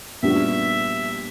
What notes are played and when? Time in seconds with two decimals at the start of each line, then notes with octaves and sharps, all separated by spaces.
0.22 A#2 G3 B3 D4 F#4 E5